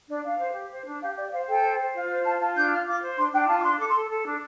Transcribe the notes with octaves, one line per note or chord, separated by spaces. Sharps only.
D4 D5
D4 F5
C5
G4
C5
D4
G4 F5
G4 D5
C5 F5
A4 G5
C5
C5
F4
C5
F4 A5
F4 A5
D4 G6
F4 F6
F4 D6
C5
D4 C6
D4 G5
F4 A5
D6
D4 C6
A4 D6
C6
A4
A4
D4